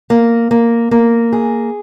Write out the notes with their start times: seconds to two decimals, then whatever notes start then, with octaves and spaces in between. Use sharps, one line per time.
0.10 A#3
0.51 A#3
0.91 A#3
1.32 G#4